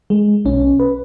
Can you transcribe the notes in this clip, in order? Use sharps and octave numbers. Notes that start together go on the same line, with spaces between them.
G#3
B1 B2 C#4
B4